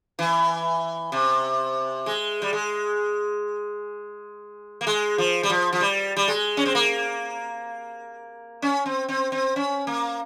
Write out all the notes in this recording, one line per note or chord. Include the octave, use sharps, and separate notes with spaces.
E3
C3
G#3
G3
G#3
A#3
G#3
F3
G3
F3
F3
G3
G3
G#3
C#4
C4
A#3
C#4
C4
C4
C4
C#4
A#3